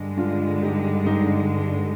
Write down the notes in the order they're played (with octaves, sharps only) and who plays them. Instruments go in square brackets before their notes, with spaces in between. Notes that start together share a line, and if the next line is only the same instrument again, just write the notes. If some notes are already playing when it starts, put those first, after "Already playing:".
Already playing: [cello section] G2 D3 G#3
[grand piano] D4 F4
D#4 G4
D#4 G4